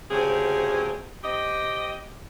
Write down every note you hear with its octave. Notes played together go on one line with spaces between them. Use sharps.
D2 C#3 C4 G4 G#4
C4 G4 D#5